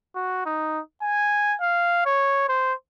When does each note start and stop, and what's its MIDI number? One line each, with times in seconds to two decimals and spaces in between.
0.16 0.46 66
0.46 0.80 63
1.02 1.56 80
1.61 2.04 77
2.06 2.44 73
2.49 2.73 72